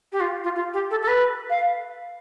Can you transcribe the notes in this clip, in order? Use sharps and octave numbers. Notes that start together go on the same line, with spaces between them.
G4
F4
F4
F4
G4
A4
A4
B4
F5